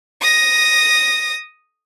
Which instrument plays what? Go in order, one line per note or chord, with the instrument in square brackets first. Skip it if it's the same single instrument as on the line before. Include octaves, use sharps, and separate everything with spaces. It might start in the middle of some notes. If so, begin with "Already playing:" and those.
[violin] D#6 A#6